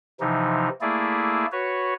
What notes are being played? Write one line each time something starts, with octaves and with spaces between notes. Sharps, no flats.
C3 E3 F3 D#4
A3 A#3 E4 G#4 D5
F#4 B4 C#5